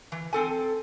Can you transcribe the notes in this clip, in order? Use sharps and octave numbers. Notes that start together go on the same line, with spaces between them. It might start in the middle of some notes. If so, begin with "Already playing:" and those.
E3
C4 A4 G#5